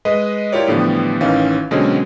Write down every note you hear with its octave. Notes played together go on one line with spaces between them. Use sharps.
G#3 B4 D#5
E4 F4 G4 A#4 C#5 D5
A2 D3 E3 F3 G3 B3
A1 D#3 E3 C#4 F5
B2 D3 F#3 G#3 C4 C#4